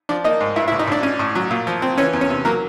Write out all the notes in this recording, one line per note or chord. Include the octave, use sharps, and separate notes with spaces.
F3 D4 D5
A#3 D#4 D#5
G#2
G2 E4 E5
E4 E5
A1
D#4 D#5
A1 D4 D5
C#4
A2
F#3
A#2
F3
C4
E3 C#4 C#5
E2
C#4 C#5
C3
F#3 A#3 A#4